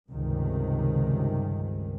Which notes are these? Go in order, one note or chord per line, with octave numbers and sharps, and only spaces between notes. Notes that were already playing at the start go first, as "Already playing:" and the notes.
C#2 G2 C3 D#3